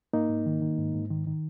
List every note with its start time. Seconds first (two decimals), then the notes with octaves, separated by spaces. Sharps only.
0.13 G#2 A#3 D#4
0.29 G#2
0.46 D#3
0.62 D#3
0.78 G#2
0.94 G#2
1.11 D#3
1.27 D#3